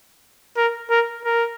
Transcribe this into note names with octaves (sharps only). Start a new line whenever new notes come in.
A#4
A#4
A#4